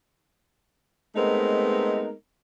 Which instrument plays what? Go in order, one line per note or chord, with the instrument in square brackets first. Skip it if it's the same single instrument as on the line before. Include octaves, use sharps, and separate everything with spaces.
[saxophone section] G#3 A3 B3 C4 D#4 A#4